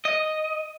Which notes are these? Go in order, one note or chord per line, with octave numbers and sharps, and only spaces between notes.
D#5